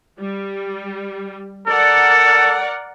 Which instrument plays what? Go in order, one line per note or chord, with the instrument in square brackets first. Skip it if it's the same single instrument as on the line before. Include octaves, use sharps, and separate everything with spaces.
[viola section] G3
[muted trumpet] A4 [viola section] A#4 D5 F#5